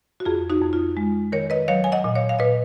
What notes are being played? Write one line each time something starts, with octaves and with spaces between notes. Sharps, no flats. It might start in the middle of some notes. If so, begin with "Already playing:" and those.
F#4
F2 F4 G#4
D#4 F#4
F2
F4
G#3
D#3 A#4 C#5
B4 D#5
F#3 C#5 F5
G#5
D#5 F#5
A#2
C#5 F5
F5
A#2 B4 D#5